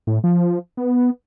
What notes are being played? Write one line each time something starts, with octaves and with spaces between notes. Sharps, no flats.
A2
F3
B3